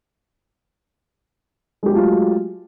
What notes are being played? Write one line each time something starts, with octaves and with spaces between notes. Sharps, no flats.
F#3 G#3 A3 F4 G4